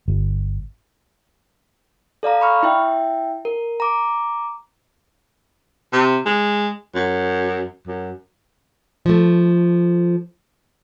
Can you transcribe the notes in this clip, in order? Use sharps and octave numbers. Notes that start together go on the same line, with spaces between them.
G1
A4 D5 F5 A#5
B5 C#6 F6
E4 E5 G5
A#4
A#5 D6
C3
G#3
F#2
F#2
F3 A3